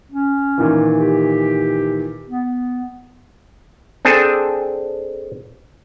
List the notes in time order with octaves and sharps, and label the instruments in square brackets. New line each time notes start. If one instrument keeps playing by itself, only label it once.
[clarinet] C#4
[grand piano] A#2 D#3 E3
[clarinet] G4
B3
[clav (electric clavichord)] C4 D4 G#4 A4